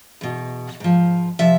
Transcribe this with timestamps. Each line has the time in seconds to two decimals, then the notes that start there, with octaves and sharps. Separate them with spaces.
0.21 E2 B2
0.80 G#2 F3
1.39 C3 F3 E5